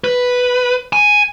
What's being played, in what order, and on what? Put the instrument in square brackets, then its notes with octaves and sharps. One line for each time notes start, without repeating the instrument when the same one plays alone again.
[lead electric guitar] B4
G#5